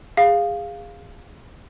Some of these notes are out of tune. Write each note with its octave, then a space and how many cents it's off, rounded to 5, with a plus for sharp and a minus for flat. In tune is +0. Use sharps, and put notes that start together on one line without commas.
G#4 -25 F5 +0